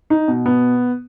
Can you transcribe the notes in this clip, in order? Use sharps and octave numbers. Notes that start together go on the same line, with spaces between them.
D#4
B2
B3